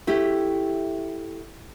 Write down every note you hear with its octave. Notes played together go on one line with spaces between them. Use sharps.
A3 E4 G4